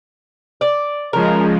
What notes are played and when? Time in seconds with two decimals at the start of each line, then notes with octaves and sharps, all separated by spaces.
0.61 D5
1.13 C#3 F3 G#3 A#4